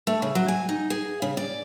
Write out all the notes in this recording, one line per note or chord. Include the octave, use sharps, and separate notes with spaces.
A3
C#3
F#3
G#5
D#4
G#4
C#3
D5